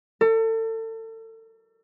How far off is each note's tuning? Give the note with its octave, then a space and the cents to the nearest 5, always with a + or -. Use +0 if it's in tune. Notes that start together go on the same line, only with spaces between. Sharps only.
A4 +35